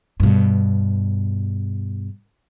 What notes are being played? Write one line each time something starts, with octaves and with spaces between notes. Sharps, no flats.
G2 B2